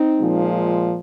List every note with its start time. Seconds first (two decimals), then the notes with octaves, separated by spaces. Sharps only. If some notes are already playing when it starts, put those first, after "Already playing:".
Already playing: C4 D#4
0.19 A#2 F3 G#3